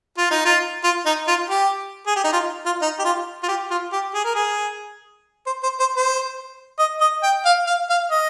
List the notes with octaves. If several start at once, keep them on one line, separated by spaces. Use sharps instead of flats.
F4
D#4
F4
F4
D#4
F4
G4
G#4
G4
D#4
F4
F4
D#4
G4
F4
F4
G4
F4
G4
G#4
A#4
G#4
C5
C5
C5
C5
D#5
D#5
G5
F5
F5
F5
D#5